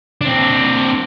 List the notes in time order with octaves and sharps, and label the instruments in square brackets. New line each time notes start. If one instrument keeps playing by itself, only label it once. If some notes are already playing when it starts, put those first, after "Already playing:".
[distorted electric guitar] C4 D4